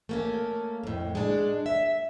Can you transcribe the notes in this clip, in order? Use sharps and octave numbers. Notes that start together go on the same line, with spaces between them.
A3 A#3 C#4
F2 A2
G#3 D4
E5